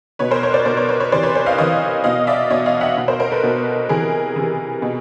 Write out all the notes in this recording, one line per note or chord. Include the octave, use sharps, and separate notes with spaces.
B2 B4 C#5
A#4 C5
B4 C#5
C5 D5
B2 A#4 C5
B4 C#5
B4 C#5
B4 C#5
C3 E3 C5 D5
B4 C#5
A#4 C5
D#5 F5
C3 E3 C#5 D#5
B2 D#5 F5
D5 E5
B2 C#5 D#5
D#5 F5
E5 F#5
B2
A#4 C5
A#4 C5
A4 B4
B2
C3 E3 G#4 A#4
C3 E3
B2